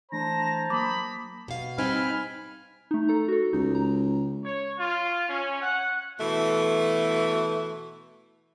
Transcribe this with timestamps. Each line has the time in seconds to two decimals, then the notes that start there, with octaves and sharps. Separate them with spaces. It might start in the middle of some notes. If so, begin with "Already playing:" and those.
0.12 E3 A3 D4 C5 A5 A#5 A#6
0.70 F#3 A#3 B5 D6 D#6
1.48 B2 F5
1.78 G3 C4 D#4 G#5 B5 F6
2.91 A3 D#4
3.08 A4 A#5
3.28 F#4 A4
3.53 C#2 D#4
3.75 A#5
4.45 C#5
4.79 F4
5.30 C#4
5.62 F#5
6.20 B2 E3 A3